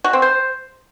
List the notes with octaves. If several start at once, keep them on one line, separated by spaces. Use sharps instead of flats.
F#4
C4
C5